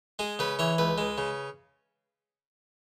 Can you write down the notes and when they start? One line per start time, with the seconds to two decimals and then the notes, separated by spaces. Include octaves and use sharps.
0.19 G#3 G#4
0.39 C#3 B4
0.59 E3 C#5
0.78 C#2 B4
0.98 G#3
1.18 C#3